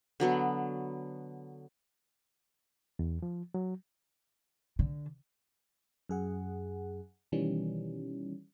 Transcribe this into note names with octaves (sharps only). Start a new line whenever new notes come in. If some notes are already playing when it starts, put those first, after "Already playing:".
D3 F#3 B3
E2
F3
F#3
D3
F#2 G#4 F#5
B2 D#3 E3 G3 C#4